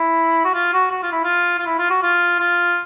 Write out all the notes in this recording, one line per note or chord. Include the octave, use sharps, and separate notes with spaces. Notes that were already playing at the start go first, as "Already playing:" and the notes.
Already playing: E4
F#4
F4
F#4
F#4
F4
E4
F4
F4
E4
F4
F#4
F4
F4